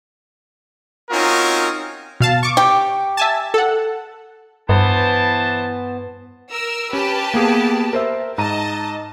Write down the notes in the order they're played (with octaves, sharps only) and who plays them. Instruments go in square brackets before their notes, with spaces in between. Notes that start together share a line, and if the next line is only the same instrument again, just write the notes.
[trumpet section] C4 C#4 D#4 F4 F#4 A#4
[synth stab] B2 F5 A5
C#6 D6
[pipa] G4
[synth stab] E5 G#5 A5
A4 F#5
[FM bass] G2 [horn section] E3 C5 A5 [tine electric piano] B3
[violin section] A#4 E6
[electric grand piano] C#4 [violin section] G4 B4 A5
[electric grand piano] A#3 B3 G#4
A#4 C5 E5
[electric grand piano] G#2 A#5 D#7 [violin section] D#5 A5